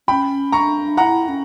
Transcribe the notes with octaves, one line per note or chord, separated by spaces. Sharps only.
C#4 G5 B5
D4 A#5 C#6
E4 F#5 A#5
C#4